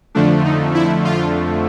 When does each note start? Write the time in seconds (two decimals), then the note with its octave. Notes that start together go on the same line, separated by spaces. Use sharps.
0.15 F2 D3 F3 A3 D4
0.45 D#4
0.75 E4
1.05 F4